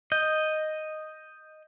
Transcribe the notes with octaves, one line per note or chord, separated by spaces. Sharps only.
D#5 G6